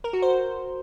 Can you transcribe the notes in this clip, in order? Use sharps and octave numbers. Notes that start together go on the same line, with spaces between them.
A#4
F#4
C5